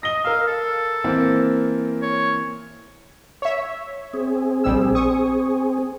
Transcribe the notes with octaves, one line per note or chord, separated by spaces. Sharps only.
D#5 A#6 G7
A#4 F5 E6
A4
E3 A#3 C4
C#5
C#5 E5
C4 G#4
A#1 G3 E6
C#6 D#6